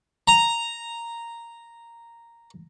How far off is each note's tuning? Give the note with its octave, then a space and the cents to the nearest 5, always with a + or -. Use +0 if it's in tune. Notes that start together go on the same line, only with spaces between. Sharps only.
A#5 -5